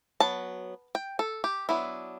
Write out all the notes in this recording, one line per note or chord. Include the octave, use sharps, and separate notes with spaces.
F#3 B3 A5
G5
A4
G4
F#3 B3 D4 E4